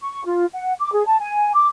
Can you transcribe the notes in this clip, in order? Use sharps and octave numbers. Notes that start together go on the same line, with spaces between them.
C#6
F4
F#5
D6
G#4
A5
G#5
D6